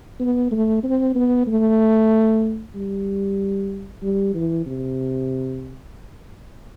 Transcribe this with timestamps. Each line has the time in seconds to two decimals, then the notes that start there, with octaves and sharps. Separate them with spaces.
0.20 B3
0.52 A3
0.84 C4
1.15 B3
1.47 A3
2.75 G3
4.03 G3
4.35 E3
4.66 C3